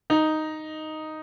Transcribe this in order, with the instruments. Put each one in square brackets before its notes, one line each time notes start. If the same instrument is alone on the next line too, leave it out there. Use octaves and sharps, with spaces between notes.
[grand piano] D#4